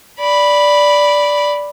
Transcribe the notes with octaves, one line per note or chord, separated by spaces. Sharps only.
D5 B5